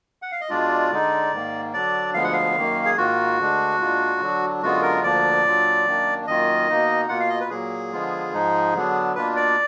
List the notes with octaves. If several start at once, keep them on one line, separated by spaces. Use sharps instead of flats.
F#5
F5
D#5
B2 G#3 D4 F4 D5
D3 G#3 D#4
G#2 D#3 A#3
D3 F#3 D4 D5
D2 D3 F3 G#3 B3 F5
F#5
F5
F#2 D#3 A#3
G#4
G#2 D#3 A#3 F4 F#4
D2 D3 G#3 D4
A#2 G#3 D4 F4
D3 F#3 D4
F#2 D3 G#3 B3 F4 F#4
A#4
D2 D3 F3 A#3 D4 D5
A#2 F#3 D4 F4
F#2 D#3 A#3 D4
F#2 D#3 A#3 F4 D#5
B2 A#3 D#4
B2 A#3 F4 F#5
F5
D#5
B4
A#2 F#3 A#3 G#4
D3 F3 G#3 B3 F4
G#2 F3 G#3 D#4
D3 F#3 B3 D4
B2 A#3 D4 F4 B4
D5